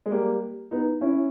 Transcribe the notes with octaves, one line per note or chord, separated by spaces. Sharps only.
G#3
G3 A#3
B3 D#4
C#4 E4